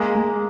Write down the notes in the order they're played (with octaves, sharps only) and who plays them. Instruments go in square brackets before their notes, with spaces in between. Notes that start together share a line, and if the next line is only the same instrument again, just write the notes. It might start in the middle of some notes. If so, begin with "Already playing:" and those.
Already playing: [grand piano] G#3 [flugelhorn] A#3
[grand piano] G#3